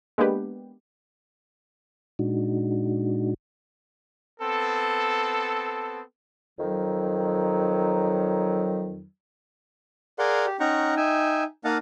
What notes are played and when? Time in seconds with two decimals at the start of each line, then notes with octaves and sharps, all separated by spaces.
0.18 G#3 A#3 B3 D4 G4 B4
2.19 A#2 G#3 D4 D#4 F#4
4.41 B3 C4 A4
6.58 F2 D#3 F#3
10.19 G#4 A#4 D5 F5 F#5 C6
10.47 G4
10.60 C#4 D#4 F#5 G5 A#5 C#6
10.97 D#4 E5 G5 G#5
11.65 A#3 D#4 D#5 F5 F#5 A5